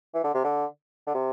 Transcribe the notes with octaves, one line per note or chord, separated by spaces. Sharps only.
E3
D3
C3
D3
D3
C3